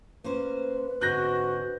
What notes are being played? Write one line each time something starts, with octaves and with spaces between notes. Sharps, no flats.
A#3 C#4 B4 C5
G#2 D3 C4 F#4 F#6 G6 A#6